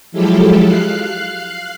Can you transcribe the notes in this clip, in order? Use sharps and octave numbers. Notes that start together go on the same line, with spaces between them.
F3 F#3 G#3 E4 G4 A4
F5 F#6 C7